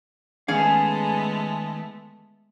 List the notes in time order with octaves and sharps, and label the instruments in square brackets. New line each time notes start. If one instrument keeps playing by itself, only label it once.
[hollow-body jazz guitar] D#3 C#4 F5 [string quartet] G#3 A3 B3 [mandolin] G#4